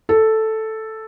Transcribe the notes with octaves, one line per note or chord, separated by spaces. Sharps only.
A4